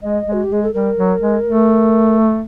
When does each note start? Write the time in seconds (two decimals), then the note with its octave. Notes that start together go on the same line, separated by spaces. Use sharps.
0.02 G#3 D#5
0.26 G#3
0.33 F#4
0.43 G4
0.50 G#3 G#4
0.63 A4
0.74 G3 A#4
0.97 F#3
1.21 G#3
1.44 A3